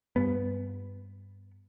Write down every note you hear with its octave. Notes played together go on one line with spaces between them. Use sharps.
G2 B3